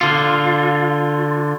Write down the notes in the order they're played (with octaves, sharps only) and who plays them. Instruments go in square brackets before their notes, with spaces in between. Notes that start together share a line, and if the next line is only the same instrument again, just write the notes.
[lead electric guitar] D3 F4